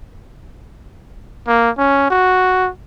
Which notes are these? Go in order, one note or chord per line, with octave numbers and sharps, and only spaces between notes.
A#3
C#4
F#4